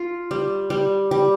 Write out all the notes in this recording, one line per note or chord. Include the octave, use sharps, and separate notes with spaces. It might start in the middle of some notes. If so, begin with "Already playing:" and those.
Already playing: F4
G3
G3
G3